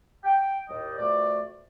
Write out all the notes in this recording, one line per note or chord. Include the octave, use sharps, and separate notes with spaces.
G5
D#2 A2 G3 D#5
F2 B2 A3 F#4 D5